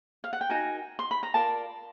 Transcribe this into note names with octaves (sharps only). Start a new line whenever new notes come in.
F5
F#5
G5
D#4 F#4 A#4 G#5
C6
B5
A#5
F4 A#4 D5 A5